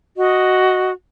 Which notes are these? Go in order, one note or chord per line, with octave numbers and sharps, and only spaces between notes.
F#4 D#5